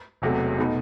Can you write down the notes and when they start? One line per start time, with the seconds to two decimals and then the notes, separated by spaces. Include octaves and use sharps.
0.22 E1 E2 C3 F#3 A3
0.58 B2 A3 D#4